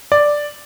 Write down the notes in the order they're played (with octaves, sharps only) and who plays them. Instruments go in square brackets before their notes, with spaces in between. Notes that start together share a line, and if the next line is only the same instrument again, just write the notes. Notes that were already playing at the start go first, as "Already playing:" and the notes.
[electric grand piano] D5